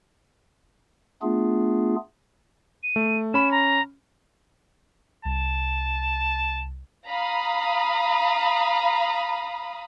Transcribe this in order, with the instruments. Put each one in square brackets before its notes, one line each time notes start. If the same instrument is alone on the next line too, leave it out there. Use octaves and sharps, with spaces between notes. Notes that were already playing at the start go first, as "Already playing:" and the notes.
[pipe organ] A3 B3 D4 F4 G#4
[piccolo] D#7
[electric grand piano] A3
[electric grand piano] C#4 B5 [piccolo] E7
[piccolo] A#5
[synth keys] C2 [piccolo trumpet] A5
[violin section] F5 A#5 B5 D#6